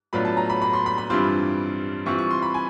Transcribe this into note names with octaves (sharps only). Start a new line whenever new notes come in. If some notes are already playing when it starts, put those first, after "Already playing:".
A2 F#3 B3 D4 F4 B5
A5
A#5
B5
B5
C6
B5
B5
G2 E3 G3 C4 F4 C6
E3 G3 C4 F4 C#6
C#6
C6
B5
G#5